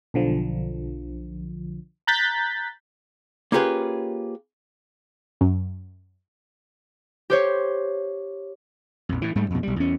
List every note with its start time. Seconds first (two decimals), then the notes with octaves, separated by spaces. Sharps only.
0.14 B1 D3 F3
2.07 A#5 F#6 G6 A6 B6
3.52 A#3 C#4 F4 G4 G#4 B4
5.41 F#2
7.30 G4 C5 C#5
9.09 A#1 F2
9.22 A2 E3
9.35 G#2 G3 A3
9.50 F2 B2
9.63 B1 G3
9.76 E2 C#4